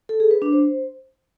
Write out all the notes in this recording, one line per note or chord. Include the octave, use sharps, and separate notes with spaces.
A4
G#4
B4
D4
C5